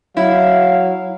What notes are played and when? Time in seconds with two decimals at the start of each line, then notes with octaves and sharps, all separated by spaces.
0.17 F#3 E4 F5